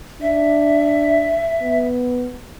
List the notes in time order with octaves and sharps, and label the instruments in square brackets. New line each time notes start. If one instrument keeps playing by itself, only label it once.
[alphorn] D4 [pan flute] E5
[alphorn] B3